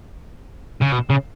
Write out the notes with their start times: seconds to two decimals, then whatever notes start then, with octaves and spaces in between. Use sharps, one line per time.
0.81 C#3
0.92 B2
1.10 C#3